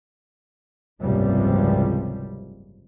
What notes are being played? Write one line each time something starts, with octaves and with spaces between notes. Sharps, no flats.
F#1 C#2 G#2 C3 F3 G3